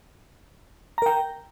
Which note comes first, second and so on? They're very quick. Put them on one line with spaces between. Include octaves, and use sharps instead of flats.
A#5 A#4 G5